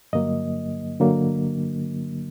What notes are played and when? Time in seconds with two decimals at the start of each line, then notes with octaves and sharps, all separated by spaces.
0.13 G2 D3 F#3 A#3 D#5
1.00 D3 F#3 A#3